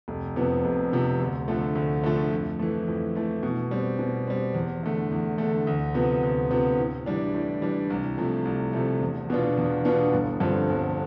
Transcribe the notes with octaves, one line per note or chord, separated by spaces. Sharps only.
F1
F2 C3 F3 B3
F1
F2 C3 F3 B3
D2
D3 F3 A3
D2
D3 F3 A3
F2
E3 A3
F2
E3 A3
B2
G3 C4
B2
G3 C4
E2
D3 A3
E2
D3 A3
D2
C3 F3 B3
D2
C3 F3 B3
A2
E3 G3 D4
A2
E3 G3 D4
C2
C3 F3 A3
C2
C3 F3 A3
E2
B2 B3 D4 F4
E2
B2 B3 D4 F4
G1
G2 D3 F3 C4
G1